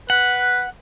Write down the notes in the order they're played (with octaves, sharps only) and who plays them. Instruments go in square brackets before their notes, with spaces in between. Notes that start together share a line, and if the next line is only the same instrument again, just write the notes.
[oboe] B4 [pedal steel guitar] F#5